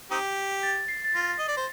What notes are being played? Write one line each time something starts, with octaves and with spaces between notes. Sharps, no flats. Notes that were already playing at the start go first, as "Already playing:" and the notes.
C4 D#4 G4
A6
C7
A6
F4 A#6
D#5
D5
C5